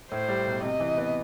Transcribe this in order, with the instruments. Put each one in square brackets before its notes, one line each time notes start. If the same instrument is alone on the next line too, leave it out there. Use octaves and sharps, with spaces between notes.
[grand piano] A2 [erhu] C5
[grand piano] G3
B1
[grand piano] C3 [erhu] D#5
[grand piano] E3
B3